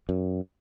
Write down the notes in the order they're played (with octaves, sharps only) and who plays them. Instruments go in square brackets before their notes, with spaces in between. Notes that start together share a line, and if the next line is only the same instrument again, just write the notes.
[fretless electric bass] F#2